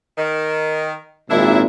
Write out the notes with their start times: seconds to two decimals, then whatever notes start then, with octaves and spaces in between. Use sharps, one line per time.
0.17 D#3
1.30 G#1 A#2 D4 E4